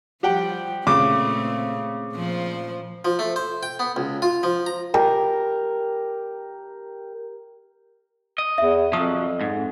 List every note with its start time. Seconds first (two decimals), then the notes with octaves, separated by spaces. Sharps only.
0.23 F3 G3 G4 F#5 G5
0.87 A#2 C#3 A3 C4 D6
2.14 A#2 F3 C5
3.05 F3
3.19 A3
3.36 C5
3.63 G5
3.79 B3
3.96 C#2
4.22 F4
4.43 F3
4.66 A#5
4.94 G4 A#4
8.38 D#5
8.58 E2 E5
8.93 F2 F3 F#3 D#6
9.41 G#2